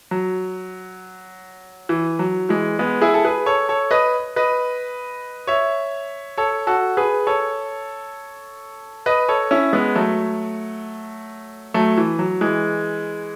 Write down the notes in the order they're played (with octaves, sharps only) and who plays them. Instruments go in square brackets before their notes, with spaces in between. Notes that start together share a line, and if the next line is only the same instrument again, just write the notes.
[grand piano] F#3
E3
F#3
E3 G#3
G#3 B3
E4 G#4
A4
G#4 B4
A4 C#5
A4 C#5
B4 D#5
B4 D#5
C#5 E5
A4 C#5
F#4 A4
G#4 B4
A4 C#5
B4 D#5
A4 C#5
C#4 E4
G#3 B3
F#3 A3
F#3 A3
E3
F#3
E3 G#3